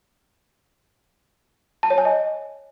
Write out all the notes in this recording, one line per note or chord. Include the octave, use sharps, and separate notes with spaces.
A5
C#5
G#5
D#5